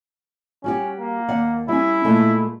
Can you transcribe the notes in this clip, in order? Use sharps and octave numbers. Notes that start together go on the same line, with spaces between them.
G3 C#4 F#4 G4
A#3
D#2 D5 F#5
G3 C#4 E4
A#2 G#3 A3